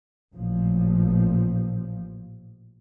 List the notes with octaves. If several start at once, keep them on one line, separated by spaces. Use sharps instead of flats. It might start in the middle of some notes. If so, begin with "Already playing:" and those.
A1 A#2 F3